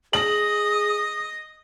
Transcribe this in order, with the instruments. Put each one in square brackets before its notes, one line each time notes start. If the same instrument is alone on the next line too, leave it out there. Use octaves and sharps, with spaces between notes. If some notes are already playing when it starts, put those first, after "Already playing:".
[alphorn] G#4 [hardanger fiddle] D#5 [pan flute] D#6 [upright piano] F#7